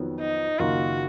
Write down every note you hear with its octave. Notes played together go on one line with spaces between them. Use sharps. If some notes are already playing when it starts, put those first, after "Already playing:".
Already playing: F2 D#3 F#3 B3
D#4
F#1 F#2 D#3 A#3 F4 F#4